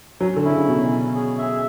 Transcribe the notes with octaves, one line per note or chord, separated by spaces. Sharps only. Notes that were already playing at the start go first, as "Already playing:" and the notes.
F#3 C#4
D3
E4
C#3
B2 C#4
C#4
G#4
E5